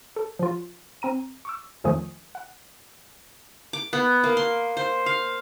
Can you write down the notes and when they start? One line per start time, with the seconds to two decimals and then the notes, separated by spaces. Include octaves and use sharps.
0.16 A4
0.39 F3 F4
1.02 C4 A#5 D#7
1.45 C#6 D6 E6
1.84 F2 D#3 F3 A3 G#5 D#6
2.35 F#5
3.73 D6
3.93 B3
4.24 A#3
4.37 C6
4.77 C5
5.06 F5